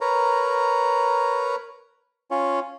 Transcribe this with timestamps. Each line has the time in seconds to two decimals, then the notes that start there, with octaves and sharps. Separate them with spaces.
0.01 A#4 B4 C#5 A#5
2.31 C#4 F4 C#5